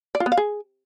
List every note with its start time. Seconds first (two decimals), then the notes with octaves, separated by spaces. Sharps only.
0.15 D5
0.20 F4
0.26 B3
0.32 F5
0.37 G#4